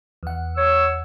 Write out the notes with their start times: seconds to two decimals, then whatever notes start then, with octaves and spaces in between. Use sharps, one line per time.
0.23 E2 F#5
0.56 C#5 E6